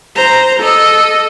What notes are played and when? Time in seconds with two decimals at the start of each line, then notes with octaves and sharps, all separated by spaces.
0.16 C5 A#5
0.60 A4 D#5